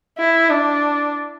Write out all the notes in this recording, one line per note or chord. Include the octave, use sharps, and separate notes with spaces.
E4
D4